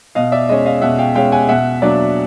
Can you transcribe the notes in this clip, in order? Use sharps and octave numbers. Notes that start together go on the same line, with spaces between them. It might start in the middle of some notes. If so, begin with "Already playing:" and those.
B2 D#5 F5
D5 E5
G#3 C#4 D#5
D#5 F5
B2 E5 F#5
F5 G5
G#3 C#4 F5 G5
F#5 G#5
B2 E5 F#5
F#3 A#3 D4 D5